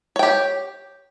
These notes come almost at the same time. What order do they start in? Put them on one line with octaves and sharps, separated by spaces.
C#5 G5 G4